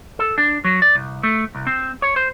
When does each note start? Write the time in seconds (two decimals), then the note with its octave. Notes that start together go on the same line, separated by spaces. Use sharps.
0.19 A4
0.38 D4
0.64 F#3
0.82 D5
0.95 C2
1.23 A3
1.55 C2
1.67 C4
2.02 C#5
2.16 C5